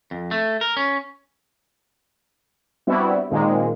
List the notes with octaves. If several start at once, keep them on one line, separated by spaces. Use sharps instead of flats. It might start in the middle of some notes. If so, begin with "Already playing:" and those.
F2
A3
A#4
C#4
G3 B3 C4 D4 E4 F#4
A#2 D#3 G#3 A#3 C4